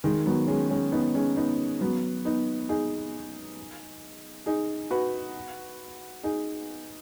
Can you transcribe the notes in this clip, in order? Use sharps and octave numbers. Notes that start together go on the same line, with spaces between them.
D#3 G#3
F#3 B3
G#3 C#4
G#3 C#4
B3 D#4
G#3 C#4
B3 D#4
F#3 B3
B3 D#4
D#4 G#4
D#4 G#4
F#4 B4
D#4 G#4